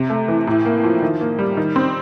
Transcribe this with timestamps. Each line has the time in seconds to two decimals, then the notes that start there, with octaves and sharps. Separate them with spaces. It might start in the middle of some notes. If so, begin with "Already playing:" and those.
Already playing: C3
0.10 A3
0.28 E3
0.47 A2
0.65 A#3
0.84 F3
1.02 D#3
1.21 A#3
1.39 G3
1.57 D#3
1.76 C4